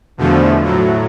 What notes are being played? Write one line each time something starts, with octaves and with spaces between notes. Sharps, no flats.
E2 B2 D3 F3 A3
A2 F#3